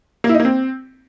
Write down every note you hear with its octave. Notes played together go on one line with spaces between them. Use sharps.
A#3
E4
D#4
A#3
C4